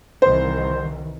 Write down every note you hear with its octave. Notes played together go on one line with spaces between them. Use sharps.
C2 D#3 E3 C5